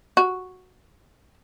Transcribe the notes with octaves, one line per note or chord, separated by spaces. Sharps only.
F#4